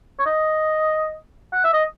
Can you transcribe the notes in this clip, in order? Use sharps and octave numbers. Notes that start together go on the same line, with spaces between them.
C#5
D#5
F#5
E5
D#5